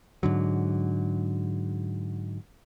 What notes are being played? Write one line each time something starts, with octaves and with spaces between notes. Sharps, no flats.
G#2 D3 F#3